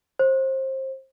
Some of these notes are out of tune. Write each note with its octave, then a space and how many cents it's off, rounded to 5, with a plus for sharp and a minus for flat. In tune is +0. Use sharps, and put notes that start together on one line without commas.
C5 +25